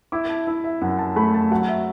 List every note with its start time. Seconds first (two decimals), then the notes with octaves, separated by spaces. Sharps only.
0.12 E4 D6
0.29 A5
0.47 E4
0.64 E5
0.81 F#2 F#5
0.99 A5
1.16 A3 B5
1.34 A5
1.51 F#3 F#5
1.68 E5